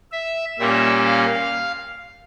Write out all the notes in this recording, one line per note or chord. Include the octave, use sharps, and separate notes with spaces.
E5
A#2 G3 A#3 C#4 E5
F5